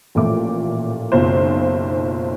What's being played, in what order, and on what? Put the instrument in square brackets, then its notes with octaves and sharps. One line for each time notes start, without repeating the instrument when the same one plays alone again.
[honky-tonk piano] A1 A#2 F3 A3 D6
F#1 B1 F4 C5